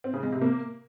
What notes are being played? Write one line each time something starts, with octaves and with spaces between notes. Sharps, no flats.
C4
C#3
G#3
C3
A#3